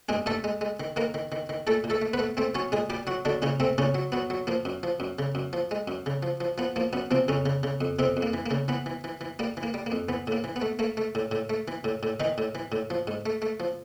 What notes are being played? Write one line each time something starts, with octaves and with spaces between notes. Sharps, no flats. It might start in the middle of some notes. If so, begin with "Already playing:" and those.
G2 G#3 G#4
G2 A3 A4
G#3
G#3
D#3
D#3 A#3 A#4
D#3
D#3
D#3
A#2 A3 A4
A#2
A3 A4
A3
B3 B4
A3
A3 C4 C5
F#3 C#4 C#5
A#2 G#3 G#4
A#2 G3 G4
F#3 F#4
D3 F#3 D4
A#2 C#3 C#4
C3 A3 C4
A#2 C#3 C#4
F#3
F#3 B3
F#3
F3 A#3
F#2
F3
F#2
C#3
F#2
F3
G#3
F#2
C#3
F3
F3
F3 B3
F3 A#3
F#2 B3
C3 F3 C4
F2 C#3 C#4
C#3
C#3
F2
F2 C3 C4
F2
A#3
E3
A#3
C#3
E3 B3
E3
E3
E3
G3 A#3
E3
A#3
G3
A#3
F2
E3 B3
A2 A#3
E3
B3
A3
A3 A#3
A3
A2
A2
A3
E3
A2
A2
D#3 E3 D#4
A2
E3
A2
F3
G#2
A3
A3
F3